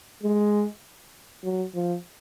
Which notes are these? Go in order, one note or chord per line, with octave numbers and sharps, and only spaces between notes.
G#3
F#3
F3